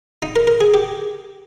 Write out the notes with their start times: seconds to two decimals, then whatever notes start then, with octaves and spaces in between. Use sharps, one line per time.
0.22 D#4
0.36 A#4
0.47 A#4
0.61 G#4
0.74 G4